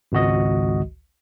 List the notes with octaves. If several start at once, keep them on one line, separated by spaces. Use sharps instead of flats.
G#1 C#2 F#4 D#5